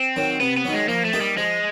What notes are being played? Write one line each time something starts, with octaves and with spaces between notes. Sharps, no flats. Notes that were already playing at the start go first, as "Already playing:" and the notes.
Already playing: C4
D#3 F#3
C3 B3
B3
D#3 F#3
G#3
F3 A#3
A3
A#3 D#4 G4
G3
F3 G#3